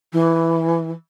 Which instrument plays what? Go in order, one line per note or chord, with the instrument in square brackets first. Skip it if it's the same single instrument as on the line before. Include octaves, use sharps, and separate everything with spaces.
[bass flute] E3